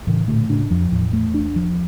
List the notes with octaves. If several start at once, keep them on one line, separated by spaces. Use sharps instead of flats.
A2 C#3 E3
A#2 D3 A3
A2 C#3 D4
F2 F3
E2 A2
A3
D4
F3